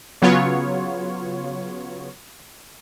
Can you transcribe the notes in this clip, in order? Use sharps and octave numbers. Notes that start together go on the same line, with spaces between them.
C#3 F#3 B3 F4 C#5